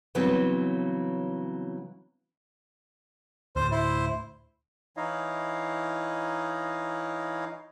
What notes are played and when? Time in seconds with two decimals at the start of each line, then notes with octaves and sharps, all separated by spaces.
0.15 C#3 E3 F#3 G3 B3 C4
3.56 D2 A2 C5
3.72 E4 C5
4.97 E3 D#4 E4 C#5 D#5 F5